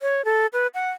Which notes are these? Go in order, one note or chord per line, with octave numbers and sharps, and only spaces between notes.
C#5
A4
B4
F#5